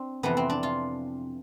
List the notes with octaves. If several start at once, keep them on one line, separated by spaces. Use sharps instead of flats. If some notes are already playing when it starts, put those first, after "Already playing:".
Already playing: C4 D4
F2 C3 E3 B3
C4
D4
F4